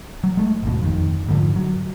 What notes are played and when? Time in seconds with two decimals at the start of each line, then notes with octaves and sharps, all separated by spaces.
0.24 F#3
0.37 G#3 A3
0.63 G#1 D#2 B2
0.82 F2 D#3
1.28 G#2 D3 F3
1.56 F#3